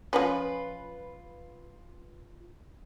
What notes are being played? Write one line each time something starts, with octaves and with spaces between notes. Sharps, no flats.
F3 G#3 C#4 F4 B4